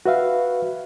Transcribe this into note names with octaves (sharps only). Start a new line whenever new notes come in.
F#4 B4 E5 F5